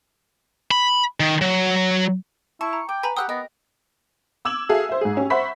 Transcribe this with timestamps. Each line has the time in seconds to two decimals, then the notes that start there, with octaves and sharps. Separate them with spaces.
0.71 B5
1.20 D#3
1.41 F#3
2.61 E4 A5 C#6
2.73 A#5
2.89 G5 D6
3.03 B4 G#5 A#5 B5
3.17 G4 C5 F#5 G5 D#6 E6 F#6
3.29 B3 A#4 D#5
4.45 D6 E6 G#6 E7 F#7
4.69 F#4 G#4 A4 E5 F5
4.89 C5 E5
5.01 G#2 G#4
5.17 C#4 G4
5.30 C5 E5 F#5 B5 C#6 B6